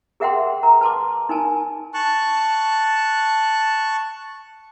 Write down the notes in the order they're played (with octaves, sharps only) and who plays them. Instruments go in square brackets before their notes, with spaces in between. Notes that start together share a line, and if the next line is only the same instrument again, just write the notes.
[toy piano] G#4 A#4 E5 F#5 G5 C6
A#4 A#5
B4 A5 C6 D6
D#4 A#4 G#5 A5
[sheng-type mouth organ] A5 C#6 F#6